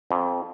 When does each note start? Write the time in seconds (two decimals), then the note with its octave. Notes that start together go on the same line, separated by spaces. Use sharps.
0.11 F2